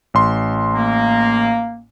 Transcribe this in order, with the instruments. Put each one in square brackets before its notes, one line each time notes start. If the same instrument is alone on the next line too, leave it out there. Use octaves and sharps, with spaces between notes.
[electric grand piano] A1 C6
[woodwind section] A#3